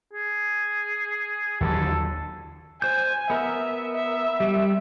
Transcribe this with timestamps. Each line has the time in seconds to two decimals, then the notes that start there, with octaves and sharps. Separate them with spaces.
0.13 G#4
1.61 D#2 D3 F#3 A4
2.82 C5 G#5 G6
3.30 B3 A#4 E5
3.95 E5
4.40 G3